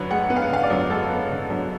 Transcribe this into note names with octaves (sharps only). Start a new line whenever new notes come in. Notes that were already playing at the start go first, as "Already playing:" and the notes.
Already playing: F#2 D3 B4 C#5
G#3 F#5
B3
F5
D3 F5
D5
F#2
G#3 A4
B3
D3
F#2